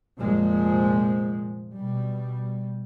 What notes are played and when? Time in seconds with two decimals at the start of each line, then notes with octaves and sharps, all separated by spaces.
0.19 F1 A#2 F3 G#3
1.73 B2 G3